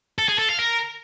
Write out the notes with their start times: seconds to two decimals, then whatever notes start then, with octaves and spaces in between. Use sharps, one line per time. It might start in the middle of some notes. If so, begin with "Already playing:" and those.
0.18 A4
0.29 G#4
0.39 A4
0.49 F5
0.59 A#4